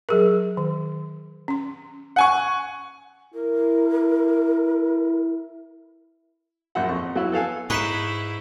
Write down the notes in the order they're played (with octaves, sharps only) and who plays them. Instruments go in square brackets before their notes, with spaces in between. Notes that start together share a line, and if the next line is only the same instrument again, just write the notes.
[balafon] F#3 G#4 A#4
D#3
C#4 C6
[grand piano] F#5 G#5 C#6
[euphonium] E4 [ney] A#4
[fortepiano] A#1 F#2 E5 F#5
F2 C#6
F#3 E4
B3 A4 F5 G#5
[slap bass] G#2 [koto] D#4 B4 C#5 [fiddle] E4 [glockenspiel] C#6 B6 E7